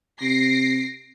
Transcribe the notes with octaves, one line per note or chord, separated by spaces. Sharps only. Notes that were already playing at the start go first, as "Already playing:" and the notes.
C3 A#6 C7 D7